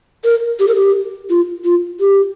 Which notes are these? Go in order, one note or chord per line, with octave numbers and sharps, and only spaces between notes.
A#4
G4
A#4
G4
F4
F4
G4